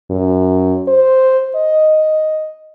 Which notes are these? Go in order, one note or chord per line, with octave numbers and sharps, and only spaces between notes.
F#2
C5
D#5